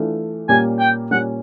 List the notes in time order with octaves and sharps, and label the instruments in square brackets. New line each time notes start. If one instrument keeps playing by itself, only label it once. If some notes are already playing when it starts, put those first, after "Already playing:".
Already playing: [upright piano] E3 A3 D4 F4
[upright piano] A#2 G3 A#3 C#4 [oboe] G#5
[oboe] G5
[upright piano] A#2 G3 A#3 C#4 [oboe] F#5